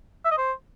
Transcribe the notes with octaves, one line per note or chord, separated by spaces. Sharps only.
E5
D#5
C5